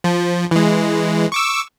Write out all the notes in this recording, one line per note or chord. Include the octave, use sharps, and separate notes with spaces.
F3
E3 G#3
C#6 D6 E6